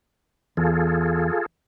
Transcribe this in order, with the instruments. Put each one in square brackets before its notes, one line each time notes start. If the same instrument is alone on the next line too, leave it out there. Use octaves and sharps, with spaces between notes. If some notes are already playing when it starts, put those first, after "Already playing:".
[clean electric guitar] E2 [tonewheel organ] F4 G#4 A4